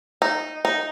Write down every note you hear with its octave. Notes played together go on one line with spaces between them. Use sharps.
D#4
D#4